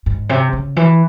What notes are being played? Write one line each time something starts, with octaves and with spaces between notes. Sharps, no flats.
G#2
C3
C#3
E3